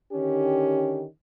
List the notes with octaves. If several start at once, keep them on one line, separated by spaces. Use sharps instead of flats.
D3 D#3 C#4 G4